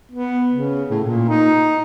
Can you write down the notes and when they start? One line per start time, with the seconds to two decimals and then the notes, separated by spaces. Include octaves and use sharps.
0.12 B3
0.52 C#3
0.90 A2
1.04 A#2
1.29 D#4